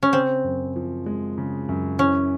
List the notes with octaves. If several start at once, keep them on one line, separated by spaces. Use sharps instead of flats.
C#4
C#3 C4
F#2
F3
G#3
C#3
F#2
E3 C#4